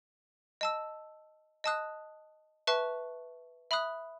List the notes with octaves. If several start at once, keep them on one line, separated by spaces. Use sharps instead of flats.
D#5 A5 E6
D#5 A5 D#6 F#6
B4 E5 A5 C#6 F#6
E5 B5 D#6 F#6